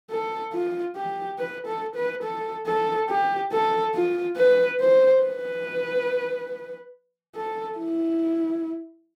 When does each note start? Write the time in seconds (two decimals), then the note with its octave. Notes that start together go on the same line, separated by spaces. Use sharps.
0.11 A4
0.53 F4
0.96 G4
1.39 B4
1.67 A4
1.96 B4
2.23 A4
2.66 A4
3.09 G4
3.52 A4
3.95 F4
4.37 B4
4.80 C5
5.22 B4
7.36 A4
7.78 E4